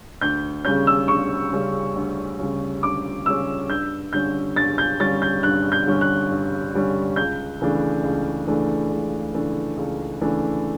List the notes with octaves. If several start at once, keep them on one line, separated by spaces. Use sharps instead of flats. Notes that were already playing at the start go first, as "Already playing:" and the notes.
D2 G6
C#3 G3 C#4 G6
E6
D2 C#6
C#3 G3 C#4
D2
C#3 G3 C#4
D2 D6
C#3 G3 C#4 E6
G2 G6
D3 G3 C#4 G6
G2 A6
G6
D3 G3 C#4 A6
G6
G2 F#6
G6
D3 G3 C#4
F#6
G2
D3 G3 C#4
C#2 G6
C#3 E3 A3 D4
C#2
C#3 E3 A3 D4
C#2
C#3 E3 A3 D4
C#2
C#3 E3 A3 D4